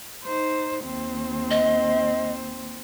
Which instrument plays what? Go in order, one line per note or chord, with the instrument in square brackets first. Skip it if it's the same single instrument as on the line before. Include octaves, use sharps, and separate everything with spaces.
[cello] D#4 C5
D#2 C4
[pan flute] D#5